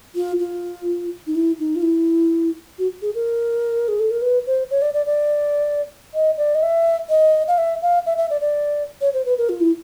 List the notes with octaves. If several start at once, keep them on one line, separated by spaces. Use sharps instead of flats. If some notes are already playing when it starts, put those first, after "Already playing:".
F4
F4
D#4
E4
D#4
F4
E4
F#4
G#4
A#4
G#4
A4
A#4
B4
C5
C#5
D5
D5
D5
D#5
D5
D#5
E5
D#5
F5
E5
F5
E5
E5
D5
D5
C#5
C5
B4
A#4
F4
E4